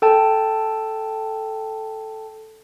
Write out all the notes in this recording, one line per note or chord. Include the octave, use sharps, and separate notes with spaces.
A4 G5 A5